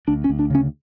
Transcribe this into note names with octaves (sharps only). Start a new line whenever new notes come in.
D2 D4
C#4
D2
D4
C#3 C#4